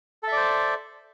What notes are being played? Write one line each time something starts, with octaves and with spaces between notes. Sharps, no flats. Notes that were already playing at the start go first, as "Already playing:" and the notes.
A4 C5 D5 E5